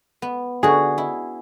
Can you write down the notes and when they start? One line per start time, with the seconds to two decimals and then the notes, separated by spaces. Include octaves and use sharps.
0.22 B3
0.63 D3 F#4 G#4
0.98 E4